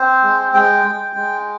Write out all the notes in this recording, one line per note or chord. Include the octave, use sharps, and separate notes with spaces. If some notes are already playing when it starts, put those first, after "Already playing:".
Already playing: C4 C5
G#3
G#3 G5
G#3
G#3